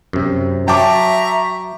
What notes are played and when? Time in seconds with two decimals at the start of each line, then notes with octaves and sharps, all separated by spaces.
0.13 F#2 C3
0.68 F#3 E5 G5 A5 A#5 C#6 D6